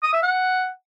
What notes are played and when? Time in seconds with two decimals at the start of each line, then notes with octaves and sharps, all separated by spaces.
0.03 D#6
0.13 E5
0.23 F#5